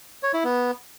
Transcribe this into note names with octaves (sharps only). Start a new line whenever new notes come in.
C#5
E4
B3